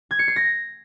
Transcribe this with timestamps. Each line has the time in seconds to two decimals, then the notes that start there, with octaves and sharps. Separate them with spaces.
0.11 G#6
0.19 C#7
0.28 C7
0.36 A#6